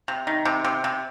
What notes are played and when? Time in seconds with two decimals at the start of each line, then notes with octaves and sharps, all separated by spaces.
0.08 C3
0.27 D#3
0.45 C3
0.64 C3
0.84 C3